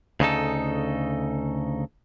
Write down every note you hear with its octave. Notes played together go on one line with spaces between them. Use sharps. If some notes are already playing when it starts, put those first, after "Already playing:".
D2 C#3 D#4 A4